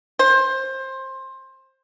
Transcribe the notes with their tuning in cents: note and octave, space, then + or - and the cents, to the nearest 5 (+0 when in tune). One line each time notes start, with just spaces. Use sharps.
C5 +20